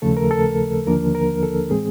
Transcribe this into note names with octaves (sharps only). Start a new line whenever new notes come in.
D#2 C#3 F3 A3 A4
A#4
A4
D#2 D3 F3 A#3 D4 A#4
A#4
A4
A2 E3 G#3 C4 G#4